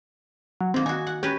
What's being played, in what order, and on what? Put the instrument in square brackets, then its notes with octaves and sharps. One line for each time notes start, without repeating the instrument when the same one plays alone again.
[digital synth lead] F#3
[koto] D#3 A#3 [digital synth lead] C4
[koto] D#4 F#4 [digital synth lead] G#5
[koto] F#5
[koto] C#4 A#4 B4 [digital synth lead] G4